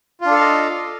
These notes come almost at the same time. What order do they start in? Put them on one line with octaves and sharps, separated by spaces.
F4 D4 A4 F5 D#5